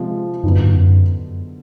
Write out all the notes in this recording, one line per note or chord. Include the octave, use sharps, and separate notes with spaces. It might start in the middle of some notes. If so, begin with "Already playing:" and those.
Already playing: C3 F3 G#3
F#2 D3 F#3 B3 D#4
G2
F#2